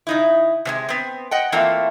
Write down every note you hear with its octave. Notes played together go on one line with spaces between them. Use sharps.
C#3 D#4 E4
C3 F3 G#3
B3 C4
D#5 F#5 G5
E3 A3 A#3 C4 F4